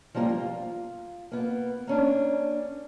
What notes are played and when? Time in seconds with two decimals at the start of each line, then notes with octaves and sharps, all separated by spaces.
0.15 F3 G3 A#3 F4
0.29 F4
1.32 A#3 B3
1.87 A#3 C#4 D4